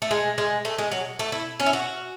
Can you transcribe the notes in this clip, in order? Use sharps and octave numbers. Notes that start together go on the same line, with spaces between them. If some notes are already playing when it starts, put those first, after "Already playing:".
A3
G#3
G#3
A3
G#3
F#3
A3
E4
C#4
E4
F#4